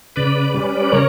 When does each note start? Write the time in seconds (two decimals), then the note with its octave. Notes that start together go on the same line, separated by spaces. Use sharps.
0.16 C#3 B4 D5
0.54 G3 C#4
0.81 B4
0.92 C#3 A#4 C#5